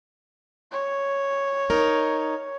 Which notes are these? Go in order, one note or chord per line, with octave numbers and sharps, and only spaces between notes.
C#5
D#4 A#4